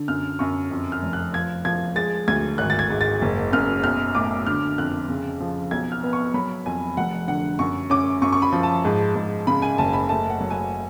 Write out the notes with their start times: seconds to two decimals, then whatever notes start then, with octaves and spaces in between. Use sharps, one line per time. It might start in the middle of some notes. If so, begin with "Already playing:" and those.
Already playing: D3
0.08 F#2 F6
0.39 F#2 C#6
0.71 F2
0.92 F6
1.02 F1
1.13 F#6
1.33 F3 G#6
1.65 F3 G#6
1.95 G#3 A6
2.28 D2 G#6
2.58 G#1 F#6
2.70 A6
2.79 G#6
2.90 G#2
3.01 A6
3.22 F#1
3.52 F#2 F6
3.83 B1 F6
4.15 A2 D6
4.46 D3 F6
4.78 F2 F#6
5.09 C#3
5.40 F3
5.71 B1 G#6
5.92 F6
6.03 B3
6.13 C#6
6.34 F#3 B5
6.66 F2 G#5
6.97 F1 F#5
7.28 D3 F#5
7.59 F#2 C#6
7.90 C#4 D6
8.22 F#2 C#6
8.33 C#6
8.42 B5
8.52 F3
8.63 A5
8.85 G#2
9.15 G#2
9.47 C#3 B5
9.62 G#5
9.78 F#1 A5
9.93 B5
10.09 A3 A5
10.30 F#5
10.40 F#3
10.51 G#5